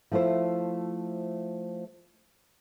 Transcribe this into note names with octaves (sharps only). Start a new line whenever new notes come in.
F3 A3 E4 F4 C5